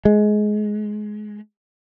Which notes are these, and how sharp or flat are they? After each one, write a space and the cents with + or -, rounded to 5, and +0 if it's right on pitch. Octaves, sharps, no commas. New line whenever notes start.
G#3 +20